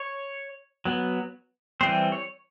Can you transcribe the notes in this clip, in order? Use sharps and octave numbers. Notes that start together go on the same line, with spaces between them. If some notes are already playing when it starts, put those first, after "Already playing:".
Already playing: C#5
F#3 B3
E3 G3 C4 C5
C#5